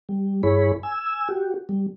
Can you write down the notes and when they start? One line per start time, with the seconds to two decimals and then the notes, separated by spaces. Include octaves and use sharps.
0.09 G3
0.43 G2 E4 G#4 C#5 B5
0.83 G#5 E6
1.29 F#4 G4
1.69 G3